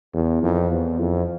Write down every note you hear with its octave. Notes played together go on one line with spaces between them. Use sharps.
E2
F2
E2
F2